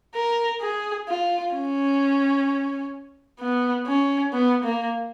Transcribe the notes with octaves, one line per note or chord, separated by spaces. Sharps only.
A#4
G#4
F4
C#4
B3
C#4
B3
A#3